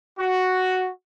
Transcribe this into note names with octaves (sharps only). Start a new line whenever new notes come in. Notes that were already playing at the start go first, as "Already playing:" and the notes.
F#4